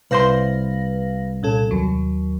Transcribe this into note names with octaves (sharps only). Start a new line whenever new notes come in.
C2 B4 C5 F5 C6 A#6
A#2 C#4 A4
D#2 F#3